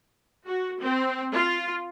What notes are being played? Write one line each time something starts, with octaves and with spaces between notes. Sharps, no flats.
F#4
C4
F4